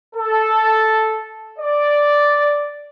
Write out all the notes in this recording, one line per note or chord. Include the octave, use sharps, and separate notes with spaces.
A4
D5